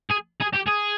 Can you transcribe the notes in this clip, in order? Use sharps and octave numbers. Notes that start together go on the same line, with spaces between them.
G#4
G#4
G4
G#4